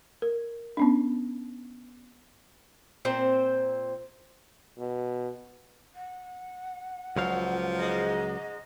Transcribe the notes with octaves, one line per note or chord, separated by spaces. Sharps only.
A#4
B3 C#4 D4
A#2 C4 C5
B2
F#5
C#2 A#2 F3 F#3 F5
G#2 G#3 D#5